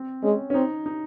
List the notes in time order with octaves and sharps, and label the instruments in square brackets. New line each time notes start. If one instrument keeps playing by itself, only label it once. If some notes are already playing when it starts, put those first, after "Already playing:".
Already playing: [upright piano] C4
[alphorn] G#3 [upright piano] C#4
[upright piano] C#4
[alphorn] C4 [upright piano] D#4
[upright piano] D#4